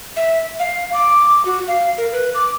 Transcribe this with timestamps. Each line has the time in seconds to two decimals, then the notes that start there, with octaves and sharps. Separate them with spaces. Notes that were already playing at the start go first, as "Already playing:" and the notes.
0.16 E5
0.59 F5
0.94 D6
1.45 F#4
1.68 F5
1.98 A#4
2.13 B4
2.35 D6